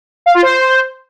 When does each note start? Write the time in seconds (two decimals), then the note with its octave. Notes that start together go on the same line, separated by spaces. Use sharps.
0.26 F5
0.34 F4
0.43 C5